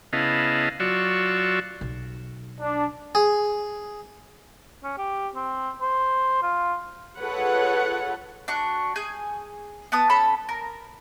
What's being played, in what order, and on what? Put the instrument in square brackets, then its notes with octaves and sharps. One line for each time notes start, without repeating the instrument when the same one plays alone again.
[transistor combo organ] C#3 B3 E4 D#5 F5 A5
F#3 F4 F#4 D5 C#6 E6
[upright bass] B1
[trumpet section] D4
[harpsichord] G#4
[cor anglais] C#4
G4
C4
C5
F4
[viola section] F4 G#4 A4 B4 C#5 F#5
[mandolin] D4 F#4 C#6
G#4 G#5 G6
B3 A5 D#6
C#4 A4 A5 B5
A#4